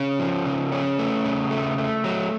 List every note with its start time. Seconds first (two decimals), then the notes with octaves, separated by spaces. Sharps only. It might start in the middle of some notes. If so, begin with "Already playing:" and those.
Already playing: C#3 C#4
0.19 F3
0.46 C#3
0.72 C#4
0.99 A3
1.25 C#3
1.51 A3
1.78 A3
2.04 F#3